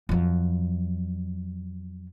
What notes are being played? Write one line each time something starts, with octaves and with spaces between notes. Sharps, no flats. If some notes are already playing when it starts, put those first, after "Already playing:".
F2 F#3